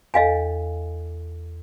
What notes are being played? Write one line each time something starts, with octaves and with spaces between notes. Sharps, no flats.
E2 A4 D#5 F5 G#5